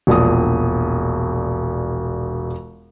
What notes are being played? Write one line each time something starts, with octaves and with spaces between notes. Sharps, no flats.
E1 A#1 D5 D#6